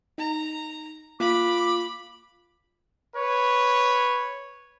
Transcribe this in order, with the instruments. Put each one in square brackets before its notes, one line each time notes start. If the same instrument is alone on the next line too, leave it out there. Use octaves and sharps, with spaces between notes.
[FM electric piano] D#4 [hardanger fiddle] A#5
[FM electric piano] A#3 [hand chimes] F4 F5 [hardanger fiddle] B5 [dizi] D6
[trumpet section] B4 C#5